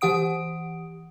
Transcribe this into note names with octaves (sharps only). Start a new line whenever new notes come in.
E3 G4 F#5 D#6 D7